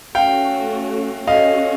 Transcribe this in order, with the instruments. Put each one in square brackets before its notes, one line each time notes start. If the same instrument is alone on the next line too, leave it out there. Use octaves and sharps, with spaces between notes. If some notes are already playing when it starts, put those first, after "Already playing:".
[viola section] A3 C#4 F#4 [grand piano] F5 G5
[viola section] C#4 F#4 A4 [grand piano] D#5 F5